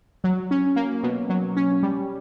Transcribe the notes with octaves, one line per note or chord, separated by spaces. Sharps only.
F#3
C#4
A#3
B2
F#3
C#4
G3